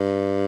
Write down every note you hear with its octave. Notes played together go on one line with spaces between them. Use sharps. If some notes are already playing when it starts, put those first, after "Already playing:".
Already playing: G2